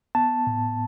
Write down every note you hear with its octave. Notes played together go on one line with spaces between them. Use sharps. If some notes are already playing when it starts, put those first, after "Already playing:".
B3 A5
A2